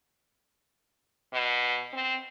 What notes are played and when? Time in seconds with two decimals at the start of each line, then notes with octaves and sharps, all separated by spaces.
1.33 B2
1.93 C4